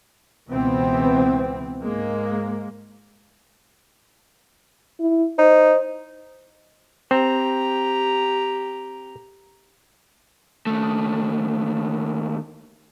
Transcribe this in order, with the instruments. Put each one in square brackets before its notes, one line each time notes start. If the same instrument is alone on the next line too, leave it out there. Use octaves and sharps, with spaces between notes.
[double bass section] C#2 B2 E3 B3 C4
G#2 G#3 A#3
[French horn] E4
[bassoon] D#4 [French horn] C5
[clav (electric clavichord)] C4 [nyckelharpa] G4 A#5
[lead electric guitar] D#2 A3